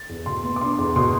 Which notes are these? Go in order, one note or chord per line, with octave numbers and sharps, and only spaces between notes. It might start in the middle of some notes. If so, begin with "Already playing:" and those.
Already playing: A6
E2
B2 C6
B3
D6
D4 C6
E2
B2 C6